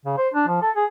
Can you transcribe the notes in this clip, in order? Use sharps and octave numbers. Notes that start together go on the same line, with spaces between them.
C#3
C5
D4
F3
A4
G#4